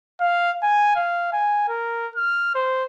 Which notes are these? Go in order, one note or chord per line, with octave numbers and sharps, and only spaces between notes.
F5
G#5
F5
G#5
A#4
F6
C5